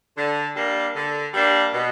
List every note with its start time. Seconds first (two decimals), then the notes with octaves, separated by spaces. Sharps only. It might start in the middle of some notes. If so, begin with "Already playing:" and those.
0.16 D3
0.55 G3 A#3 D4
0.95 D3
1.33 G3 A#3 D4
1.73 B2